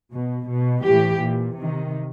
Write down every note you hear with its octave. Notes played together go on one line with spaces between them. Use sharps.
B2
B2
A2 E3 G4
A#2
C3 D#3